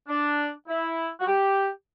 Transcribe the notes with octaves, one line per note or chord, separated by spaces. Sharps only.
D4
E4
F#4
G4